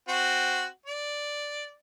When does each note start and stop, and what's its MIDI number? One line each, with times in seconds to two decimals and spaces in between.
0.08 0.64 60
0.08 0.64 66
0.86 1.74 74